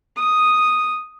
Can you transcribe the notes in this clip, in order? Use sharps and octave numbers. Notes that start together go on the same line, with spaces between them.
D#6